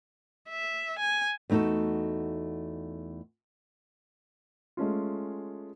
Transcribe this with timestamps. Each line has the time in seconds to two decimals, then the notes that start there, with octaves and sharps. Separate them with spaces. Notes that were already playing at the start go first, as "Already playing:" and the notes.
0.49 E5
0.99 G#5
1.50 E2 A3 D#4 F#4 A4
4.77 G#3 A3 C#4 F4